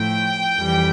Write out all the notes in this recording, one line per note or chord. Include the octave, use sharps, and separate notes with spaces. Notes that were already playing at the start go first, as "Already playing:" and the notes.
Already playing: A2 F3 A3 G5
F2 E3 G3